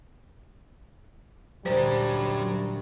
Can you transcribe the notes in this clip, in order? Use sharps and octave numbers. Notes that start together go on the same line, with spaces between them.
D2 A#2 F#3 G3 A3 A#4 C5